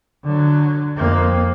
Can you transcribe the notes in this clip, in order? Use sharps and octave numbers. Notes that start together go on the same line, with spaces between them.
D3 F#3
F2 A#3